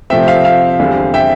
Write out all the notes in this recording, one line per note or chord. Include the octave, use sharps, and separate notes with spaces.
C3 F3 A3 C4 E5 G5
F5
F5
E2 D3 G3 C4
E5 G5